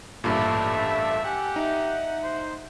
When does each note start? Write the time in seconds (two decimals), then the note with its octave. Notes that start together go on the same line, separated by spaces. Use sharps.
0.24 A1 G2 A#2 A3 E5 B5 D6
1.25 G4 F#5 G#5
1.56 D#4 E5
2.24 C5